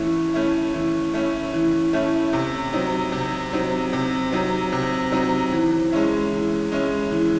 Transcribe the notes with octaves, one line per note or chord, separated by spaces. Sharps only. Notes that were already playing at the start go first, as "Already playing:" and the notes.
Already playing: E3 A3 C#4 E4
A3 C#4 E4
E3
A3 C#4 E4
E3
A3 C#4 E4
C3
F#3 C4 D#4
C3
F#3 C4 D#4
C3
F#3 C4 D#4
C3
F#3 C4 D#4
E3
G#3 C#4 E4
E3
G#3 C#4 E4
E3